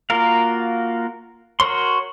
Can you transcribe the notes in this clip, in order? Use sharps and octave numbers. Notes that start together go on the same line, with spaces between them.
A#3 F4 F#4 A#4 F5
F#4 A#4 C#5 C6